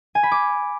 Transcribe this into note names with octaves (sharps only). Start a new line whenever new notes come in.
G#5
B5
D6